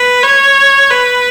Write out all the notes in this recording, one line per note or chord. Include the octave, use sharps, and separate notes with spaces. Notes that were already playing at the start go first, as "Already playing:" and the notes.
Already playing: B4
C#5
B4